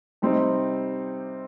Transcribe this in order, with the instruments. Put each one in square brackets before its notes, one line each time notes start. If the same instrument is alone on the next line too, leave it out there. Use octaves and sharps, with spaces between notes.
[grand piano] C3 G3 C4 D#4